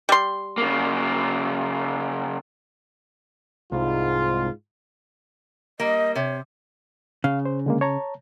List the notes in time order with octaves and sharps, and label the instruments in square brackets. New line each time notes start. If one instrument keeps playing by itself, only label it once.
[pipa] G3 C6
[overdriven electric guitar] C#3 A#3
[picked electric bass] C2 [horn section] G#2 F4
[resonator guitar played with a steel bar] G3 A#3 [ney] D#5
[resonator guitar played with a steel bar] C3 [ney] C#5
[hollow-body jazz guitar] C#3 [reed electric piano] F5
[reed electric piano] C5
D3 G#3 A#3
C#5 A5 A#5